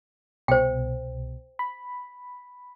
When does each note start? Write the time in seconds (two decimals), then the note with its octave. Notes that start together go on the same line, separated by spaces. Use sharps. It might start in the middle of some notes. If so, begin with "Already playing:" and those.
0.48 C2 B2 C5 G5
1.59 B5